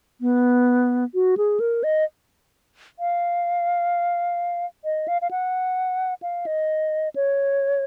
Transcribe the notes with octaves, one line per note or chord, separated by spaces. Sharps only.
B3
F#4
G#4
A#4
D#5
F5
D#5
F5
F5
F#5
F5
D#5
C#5